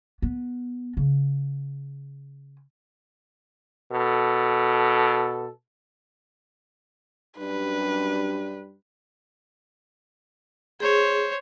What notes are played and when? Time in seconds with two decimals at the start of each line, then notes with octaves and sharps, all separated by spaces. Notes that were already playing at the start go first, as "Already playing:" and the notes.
0.22 B3
0.97 C#3
3.91 B2 A4
7.39 F#2 G3 D4 B4
10.80 G#4 C5 C#5